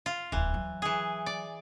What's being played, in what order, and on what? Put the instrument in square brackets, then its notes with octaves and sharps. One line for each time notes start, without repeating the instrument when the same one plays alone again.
[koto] F4
[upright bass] D1 E2 [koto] E3
[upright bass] F#3
[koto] E3 G#4
D5